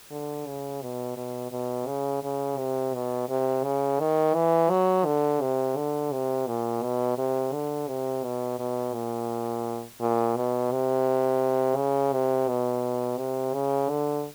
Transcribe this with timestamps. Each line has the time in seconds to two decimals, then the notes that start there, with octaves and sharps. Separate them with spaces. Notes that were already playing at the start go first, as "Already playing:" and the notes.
0.11 D3
0.47 C#3
0.82 B2
1.17 B2
1.52 B2
1.87 C#3
2.23 C#3
2.58 C3
2.94 B2
3.29 C3
3.64 C#3
4.00 D#3
4.35 E3
4.70 F#3
5.06 D3
5.41 C3
5.77 D3
6.12 C3
6.47 A#2
6.83 B2
7.18 C3
7.53 D3
7.88 C3
8.24 B2
8.59 B2
8.94 A#2
10.01 A#2
10.36 B2
10.72 C3
11.77 C#3
12.13 C3
12.48 B2
13.18 C3
13.53 C#3
13.89 D3